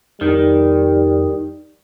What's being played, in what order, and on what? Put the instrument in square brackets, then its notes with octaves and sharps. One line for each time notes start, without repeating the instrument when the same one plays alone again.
[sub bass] F2 [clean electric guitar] D#3 [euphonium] G3